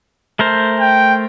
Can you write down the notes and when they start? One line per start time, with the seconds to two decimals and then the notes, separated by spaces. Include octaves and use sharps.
0.39 A3 A#4 C5
0.80 G5